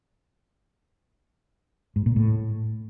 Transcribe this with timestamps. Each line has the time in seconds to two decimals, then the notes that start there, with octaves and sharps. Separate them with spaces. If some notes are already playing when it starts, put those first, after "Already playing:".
1.96 G#2
2.06 A#2
2.16 A2